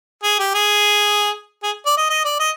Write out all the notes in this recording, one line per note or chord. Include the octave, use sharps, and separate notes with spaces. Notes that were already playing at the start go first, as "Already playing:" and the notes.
G#4
G4
G#4
G#4
D5
D#5
D#5
D5
D#5